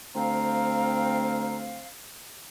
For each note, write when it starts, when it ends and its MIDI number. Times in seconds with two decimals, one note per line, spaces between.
0.15 1.83 38
0.15 1.88 60
0.15 1.88 77
0.15 1.56 82